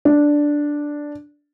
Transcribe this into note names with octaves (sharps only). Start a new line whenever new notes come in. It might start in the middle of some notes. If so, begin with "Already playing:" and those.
D4